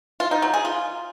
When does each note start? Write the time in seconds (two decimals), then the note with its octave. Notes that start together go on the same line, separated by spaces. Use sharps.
0.20 F4
0.31 D#4
0.42 F#3
0.54 G#4
0.65 F4